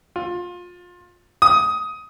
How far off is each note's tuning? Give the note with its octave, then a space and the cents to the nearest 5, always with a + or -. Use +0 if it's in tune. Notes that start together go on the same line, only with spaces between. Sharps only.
F4 +25
D#6 +15